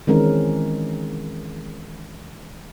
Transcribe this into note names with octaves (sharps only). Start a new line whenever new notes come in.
D#3 E3 G#3 C4 C#4 A#4